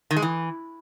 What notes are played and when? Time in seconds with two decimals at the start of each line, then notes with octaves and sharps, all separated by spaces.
0.11 D#3
0.16 G#3
0.22 E3